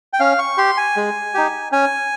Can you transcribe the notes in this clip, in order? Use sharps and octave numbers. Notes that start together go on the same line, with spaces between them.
G5
C#4 F5
C#6
G4 C6
G#5
G#3
D#4 G4
C#4 G#5